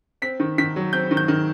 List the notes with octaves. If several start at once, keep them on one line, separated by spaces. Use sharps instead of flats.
C4 B6
D#3
D#3 B6
F#3
C4 G6
D#3
G6
D#3